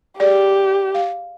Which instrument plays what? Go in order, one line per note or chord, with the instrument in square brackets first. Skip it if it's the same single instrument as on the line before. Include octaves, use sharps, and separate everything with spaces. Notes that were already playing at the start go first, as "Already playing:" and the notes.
[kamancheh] G4 [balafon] G#4 D5
[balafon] F5